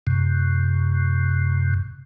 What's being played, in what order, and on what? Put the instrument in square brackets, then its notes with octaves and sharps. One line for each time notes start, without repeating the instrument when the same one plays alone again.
[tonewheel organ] F#2 C3